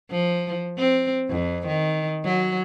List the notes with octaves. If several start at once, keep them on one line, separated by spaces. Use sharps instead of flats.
F3
C4
F2
D#3
F#3